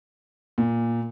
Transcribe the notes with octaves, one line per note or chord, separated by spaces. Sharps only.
A#2